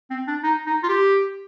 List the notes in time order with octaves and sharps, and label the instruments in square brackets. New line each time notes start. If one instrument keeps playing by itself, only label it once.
[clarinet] C4
D4
D#4
D#4
F4
G4